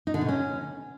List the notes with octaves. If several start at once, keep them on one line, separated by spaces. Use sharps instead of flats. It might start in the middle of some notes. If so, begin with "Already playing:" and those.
D#4
D3
B2
C#4